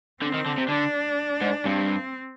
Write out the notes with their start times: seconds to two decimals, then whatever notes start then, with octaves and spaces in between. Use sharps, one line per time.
0.22 D3 C4
0.34 D#3
0.46 D3
0.58 C3
0.69 D3 D4
1.42 G#2
1.65 G2 C4